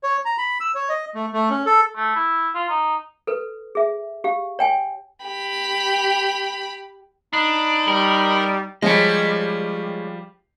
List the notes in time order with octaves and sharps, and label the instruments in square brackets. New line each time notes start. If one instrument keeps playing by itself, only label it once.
[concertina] C#5
A#5
B5
E6
C#5
D#5
A3
A3
C#4
A4
[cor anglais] A3
E4
F4
D#4
[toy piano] A4 B4
G#4 E5
G4 F5
C#5 G5 G#5
[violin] G4 B5
[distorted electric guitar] D4 [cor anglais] D#4 [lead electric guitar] B5
[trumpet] G3 [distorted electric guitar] A#4
[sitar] F3 G3 [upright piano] G#3 [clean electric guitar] C#5 D#5